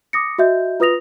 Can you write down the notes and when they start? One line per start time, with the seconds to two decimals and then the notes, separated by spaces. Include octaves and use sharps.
0.13 D6 D#6 A#6 C#7
0.38 F#4 D#5 E5 G6
0.80 F4 B4 D#6 A#6 F7